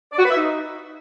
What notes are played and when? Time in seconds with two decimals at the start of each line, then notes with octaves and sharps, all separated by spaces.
0.13 D5
0.19 F#4
0.25 B4
0.31 E5
0.37 D#4